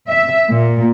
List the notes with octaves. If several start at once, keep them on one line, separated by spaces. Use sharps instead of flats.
E5
A#2